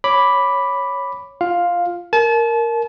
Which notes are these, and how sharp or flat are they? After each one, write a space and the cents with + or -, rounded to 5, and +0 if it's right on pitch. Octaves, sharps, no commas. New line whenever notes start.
C#5 +0 B5 +0 D6 +0
F4 +0 F5 +5
A#4 -5 A5 -35